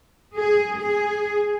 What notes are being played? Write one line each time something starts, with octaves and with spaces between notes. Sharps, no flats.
G#4
G#4